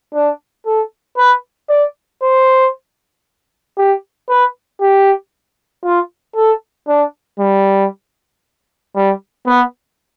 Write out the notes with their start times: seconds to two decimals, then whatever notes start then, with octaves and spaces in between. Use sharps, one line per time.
0.15 D4
0.66 A4
1.18 B4
1.69 D5
2.22 C5
3.78 G4
4.30 B4
4.81 G4
5.84 F4
6.36 A4
6.88 D4
7.39 G3
8.96 G3
9.47 B3